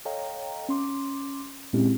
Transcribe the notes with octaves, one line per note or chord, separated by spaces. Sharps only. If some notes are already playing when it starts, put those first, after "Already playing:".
A4 C#5 D#5 F5 G5 A#5
C#4 C6 D6
A#2 G#3 C4 C#4 E4 G4